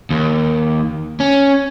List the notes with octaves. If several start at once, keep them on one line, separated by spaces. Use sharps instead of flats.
D#2
C#4